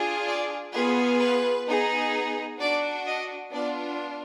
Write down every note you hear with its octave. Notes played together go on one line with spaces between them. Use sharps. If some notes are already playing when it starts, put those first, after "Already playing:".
Already playing: D4 F4 G#4
D5
B3 F4 G#4 B4
B4
B3 D#4 G#4
D4 F#4 D5
D#5
B3 D4 F4 D5